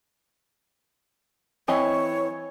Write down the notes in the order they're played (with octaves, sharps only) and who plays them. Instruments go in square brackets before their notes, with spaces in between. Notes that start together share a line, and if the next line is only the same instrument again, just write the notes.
[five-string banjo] E3 C4 D#5 [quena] C#5